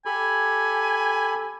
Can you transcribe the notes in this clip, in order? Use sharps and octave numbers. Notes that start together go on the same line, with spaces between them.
G4 A4 G#5 B5